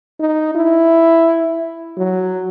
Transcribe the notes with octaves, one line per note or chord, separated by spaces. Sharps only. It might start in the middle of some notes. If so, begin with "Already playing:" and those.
D#4
E4
F#3